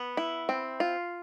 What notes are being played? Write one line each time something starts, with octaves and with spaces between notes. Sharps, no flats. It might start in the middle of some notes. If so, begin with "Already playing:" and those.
Already playing: B3
E4
C4
F4